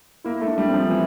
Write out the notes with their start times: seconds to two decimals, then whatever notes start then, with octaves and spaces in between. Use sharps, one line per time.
0.24 A#3 E4
0.41 A3
0.47 D4
0.58 G3
0.69 F3 C4
0.90 E3 C4